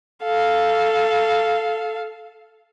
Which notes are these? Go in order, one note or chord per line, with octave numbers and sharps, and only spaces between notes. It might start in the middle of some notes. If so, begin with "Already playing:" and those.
A4 F5